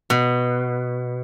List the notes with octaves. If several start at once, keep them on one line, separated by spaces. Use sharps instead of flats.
B2